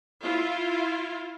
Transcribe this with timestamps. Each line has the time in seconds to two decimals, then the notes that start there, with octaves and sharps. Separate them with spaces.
0.23 E4 F4